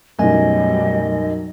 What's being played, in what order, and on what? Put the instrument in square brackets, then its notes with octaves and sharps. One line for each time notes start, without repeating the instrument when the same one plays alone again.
[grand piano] B1 F#2 [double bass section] B2 F#3 G3 [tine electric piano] A3 G#5 [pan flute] D#5